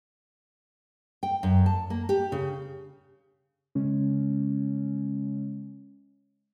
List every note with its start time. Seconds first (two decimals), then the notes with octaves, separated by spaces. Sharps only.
1.23 G5
1.43 F#2
1.66 A5
1.90 A#3
2.09 G4
2.32 C#3
3.75 C#3 G#3 C#4